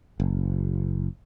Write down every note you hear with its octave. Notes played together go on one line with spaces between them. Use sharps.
F#1